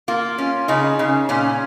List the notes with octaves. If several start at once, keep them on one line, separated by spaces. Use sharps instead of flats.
A#3 F4
C#4
C#3 D#4
C#3
A#2 C#4